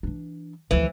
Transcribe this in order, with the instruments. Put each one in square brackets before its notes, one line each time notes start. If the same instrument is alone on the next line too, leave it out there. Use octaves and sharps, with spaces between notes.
[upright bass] E3 D4
[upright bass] D2 F3 [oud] E3